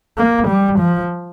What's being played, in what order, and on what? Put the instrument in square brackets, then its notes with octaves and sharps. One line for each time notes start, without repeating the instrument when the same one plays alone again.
[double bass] A#3
G3
F3